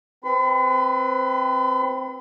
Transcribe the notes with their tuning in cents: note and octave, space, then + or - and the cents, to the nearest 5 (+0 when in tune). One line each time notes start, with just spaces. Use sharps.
C4 +0 B4 +0 B5 +45